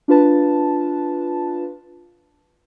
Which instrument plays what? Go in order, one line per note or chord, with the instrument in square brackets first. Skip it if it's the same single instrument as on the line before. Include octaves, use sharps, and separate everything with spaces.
[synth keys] D4 F4 B4 A5